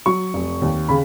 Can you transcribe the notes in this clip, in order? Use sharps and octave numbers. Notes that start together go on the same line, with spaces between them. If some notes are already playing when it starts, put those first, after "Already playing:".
F#3 C#6
F1
D#2
C#3 B5